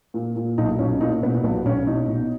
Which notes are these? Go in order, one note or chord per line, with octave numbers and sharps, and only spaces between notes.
A#2
A#2
B1 D#4
B1 C#4
A#2 D#4
B2 B3
B1 B3
B1 C#4
B2 D#4
B2